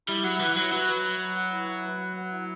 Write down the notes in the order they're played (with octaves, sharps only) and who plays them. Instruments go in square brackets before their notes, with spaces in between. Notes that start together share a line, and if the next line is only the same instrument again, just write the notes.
[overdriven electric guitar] G3 [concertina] E4
[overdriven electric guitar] F#3 [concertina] F#5
[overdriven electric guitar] E3 [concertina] E4
[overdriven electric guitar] F#3 [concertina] F#5
[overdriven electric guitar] F#3 [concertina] B4
[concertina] B4
B4
B4
F#5
E4
F#5
B4
F#5
F#5
E4